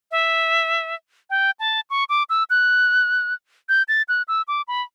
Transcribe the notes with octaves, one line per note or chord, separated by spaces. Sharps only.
E5
G5
A5
C#6
D6
E6
F#6
G6
A6
F#6
E6
D6
B5